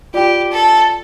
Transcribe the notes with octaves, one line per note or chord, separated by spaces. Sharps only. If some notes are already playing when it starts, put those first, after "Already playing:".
F4 G4 D5 G5
A4